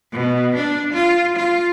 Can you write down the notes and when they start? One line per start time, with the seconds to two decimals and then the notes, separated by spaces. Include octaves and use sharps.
0.11 B2
0.55 D4
0.92 F4
1.35 F4